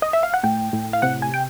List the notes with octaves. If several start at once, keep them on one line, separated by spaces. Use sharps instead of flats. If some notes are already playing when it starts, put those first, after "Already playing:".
D#5
E5
F5
F#5
A2 G5
A2
F5
C3 F#5
G#5
G5